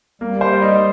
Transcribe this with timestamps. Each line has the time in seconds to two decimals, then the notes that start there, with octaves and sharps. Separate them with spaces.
0.21 G3 A#3
0.41 C5
0.62 D#4